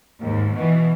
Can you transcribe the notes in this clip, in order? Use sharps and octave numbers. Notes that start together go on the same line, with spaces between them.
D#2 G#2
B2 E3